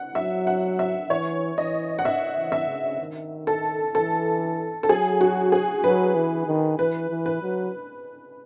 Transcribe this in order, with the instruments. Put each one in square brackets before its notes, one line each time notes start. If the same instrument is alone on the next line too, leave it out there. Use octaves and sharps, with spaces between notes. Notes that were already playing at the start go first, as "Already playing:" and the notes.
Already playing: [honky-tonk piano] F#5
[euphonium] F#3 [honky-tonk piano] E5
[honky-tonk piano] F#5
E5
[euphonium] E3 [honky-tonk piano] C#5
[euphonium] E3 [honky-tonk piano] D#5
[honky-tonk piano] F#5
E5
[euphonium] E3
[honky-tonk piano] E5
[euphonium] C#3
D#3
[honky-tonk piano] A4
[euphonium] E3 [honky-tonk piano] A4
[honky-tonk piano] A4
[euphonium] F#3 [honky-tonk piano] G#4
[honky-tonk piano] F#4
G#4
[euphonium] F#3 [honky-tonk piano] B4
[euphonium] E3
D#3
[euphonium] E3 [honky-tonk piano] B4
[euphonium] E3
[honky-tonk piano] B4
[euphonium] F#3